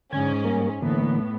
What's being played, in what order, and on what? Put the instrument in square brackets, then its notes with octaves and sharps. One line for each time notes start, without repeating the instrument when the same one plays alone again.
[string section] G#2 C#4 [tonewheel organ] D3 G#6
[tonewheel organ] G3 A#3 A#4
[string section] A2 B3 [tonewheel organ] D3 E3 A#3